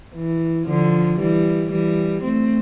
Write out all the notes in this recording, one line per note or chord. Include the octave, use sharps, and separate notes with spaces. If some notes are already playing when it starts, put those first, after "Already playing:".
E3
D3 F3
E3 G3
E3 G3
A3 C4